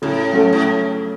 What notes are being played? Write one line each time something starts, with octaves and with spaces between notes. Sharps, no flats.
A2 C#3
F#3 A3 C#4
A2